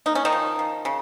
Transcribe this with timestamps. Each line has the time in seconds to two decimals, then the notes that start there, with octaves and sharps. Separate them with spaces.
0.06 A#3 D#4
0.15 C#4
0.25 D#3 D#4
0.32 F3
0.59 F3
0.85 C#3